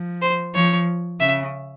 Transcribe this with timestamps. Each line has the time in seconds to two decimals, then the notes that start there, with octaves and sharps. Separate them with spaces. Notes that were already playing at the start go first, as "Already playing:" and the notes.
Already playing: F3
0.22 C5
0.55 F3 C#5
1.20 C#3 E5